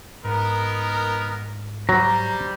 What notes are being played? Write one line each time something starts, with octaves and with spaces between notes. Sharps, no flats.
G#2 B3 D#4 A#4
F#3 G3 C5 A#5